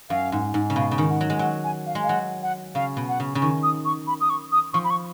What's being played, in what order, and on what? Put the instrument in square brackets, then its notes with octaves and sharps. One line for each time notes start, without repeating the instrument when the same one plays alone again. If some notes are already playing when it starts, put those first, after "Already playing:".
[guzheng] F#2 [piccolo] F5
[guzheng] G#2
G#2
C#3
[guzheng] B2 [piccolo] F5
[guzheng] C#3
D#3
[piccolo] F#5
[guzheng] F#3
G#3
[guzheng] F#3 [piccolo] F#5
[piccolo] G#5
F5
[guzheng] G#3
[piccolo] F5
[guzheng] F#3 [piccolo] F#5
[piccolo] F#5
[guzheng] C#3 [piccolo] F5
[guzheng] B2
[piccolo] F#5
[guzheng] C#3
C#3
[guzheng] D#3 [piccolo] C#6
[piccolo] D#6
C#6
B5
D#6
C#6
D#6
[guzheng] F3 [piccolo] C#6
[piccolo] B5
C#6